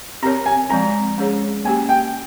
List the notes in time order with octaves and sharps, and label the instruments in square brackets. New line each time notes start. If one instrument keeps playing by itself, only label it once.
[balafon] C4 G4 A#4 C#5 [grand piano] A#5
[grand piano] G#5
[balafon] F3 G#3 C4 [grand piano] A#5
[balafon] G#3 C#4 G#4 C#5
[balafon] A#3 C#4 G4 [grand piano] G#5
[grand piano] G5